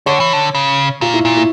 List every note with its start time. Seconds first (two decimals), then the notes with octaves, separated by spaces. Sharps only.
0.06 D3 C#5
0.20 E3
0.33 D3
0.55 C#3
1.01 A#2 F4
1.14 E4
1.25 A#2
1.37 E4